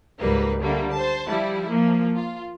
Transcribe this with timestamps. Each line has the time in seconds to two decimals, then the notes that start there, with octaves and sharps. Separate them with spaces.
0.19 C#2 G#2 G3 A#3 B4
0.61 D3 G3 A3 A#3
0.91 C5 A5
1.26 F3 G3 E4
1.67 F3 A#3
2.17 F4